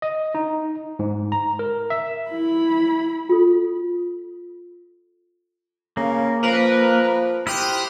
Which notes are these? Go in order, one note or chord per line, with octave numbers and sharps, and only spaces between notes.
D#5
D#4
G#2
A#5
A#4
E5
E4 B5
F4 A4
C#3 A#3
F3 A#4 B4
E4 G4 C5 D#6 F6 F#6